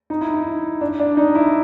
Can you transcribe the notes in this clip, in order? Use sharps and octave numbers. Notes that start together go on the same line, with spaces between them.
D#4
E4
D#4
D4
D4
D#4
E4